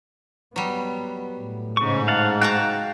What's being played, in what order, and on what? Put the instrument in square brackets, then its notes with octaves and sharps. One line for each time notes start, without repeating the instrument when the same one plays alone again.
[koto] F#3 G3 [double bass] B3
[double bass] A2
[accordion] G#2 [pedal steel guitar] C#3 C#6
[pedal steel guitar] F5 F#5 A5
[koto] F#4 A5 A#5 [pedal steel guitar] F5 G5 F#6